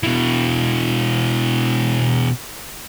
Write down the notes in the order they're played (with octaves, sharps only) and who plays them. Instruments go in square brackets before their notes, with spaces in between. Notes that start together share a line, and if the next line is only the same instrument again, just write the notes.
[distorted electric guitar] B2 E3